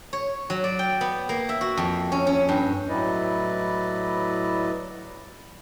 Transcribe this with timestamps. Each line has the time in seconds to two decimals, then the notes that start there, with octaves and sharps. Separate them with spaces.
0.13 C#5
0.50 F#3
0.64 D5
0.79 G5
1.01 B3
1.29 A#3
1.49 E5
1.61 F#4
1.77 F2
2.12 C#4
2.27 C#4
2.49 G2
2.89 A2 F#3 E4 B4 D5 D#5